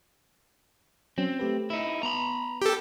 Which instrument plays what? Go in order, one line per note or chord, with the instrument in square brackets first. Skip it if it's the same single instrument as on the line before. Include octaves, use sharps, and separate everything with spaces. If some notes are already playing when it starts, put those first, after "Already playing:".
[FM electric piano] F#3 C#4 [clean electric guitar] C4
[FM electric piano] A3 G4 B4
[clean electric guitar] D#4 E4
[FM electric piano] B3 [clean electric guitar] A#5 B5
[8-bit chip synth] G4 A4